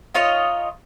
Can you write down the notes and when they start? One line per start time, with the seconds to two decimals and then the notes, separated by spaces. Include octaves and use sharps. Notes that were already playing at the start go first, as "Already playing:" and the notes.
0.14 D#4 F4 C#5 D#5